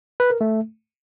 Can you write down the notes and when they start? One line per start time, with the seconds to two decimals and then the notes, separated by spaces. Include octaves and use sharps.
0.20 B4
0.30 A#4
0.41 A3